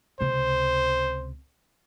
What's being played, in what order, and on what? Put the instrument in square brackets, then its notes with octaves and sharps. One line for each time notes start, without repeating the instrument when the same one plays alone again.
[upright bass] C#2 C3 [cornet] C5